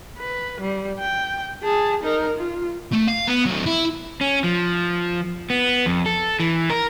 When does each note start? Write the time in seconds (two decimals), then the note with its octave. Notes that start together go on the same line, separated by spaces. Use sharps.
0.18 B4
0.61 G3
1.00 G5
1.63 G#4 A5
2.03 D#4 A#4
2.37 F4
2.92 A3
3.07 F5
3.27 B3
3.46 F#3 C4
3.66 E4
4.21 C#4
4.44 F3
5.50 B3
5.86 F2
6.06 A4
6.40 E3
6.70 A#4